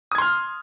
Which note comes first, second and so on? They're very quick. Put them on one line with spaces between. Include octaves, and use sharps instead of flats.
D#6 G#6 C6 F6